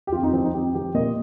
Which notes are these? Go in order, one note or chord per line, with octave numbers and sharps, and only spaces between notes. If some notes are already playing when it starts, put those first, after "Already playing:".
G4
F2 F4
D#4
F3 C4
D#4
F2 G4
F3 G4
A#2 D#5